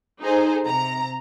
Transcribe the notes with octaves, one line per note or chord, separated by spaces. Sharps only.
D#4 G#4 A4 C5
C3 A#5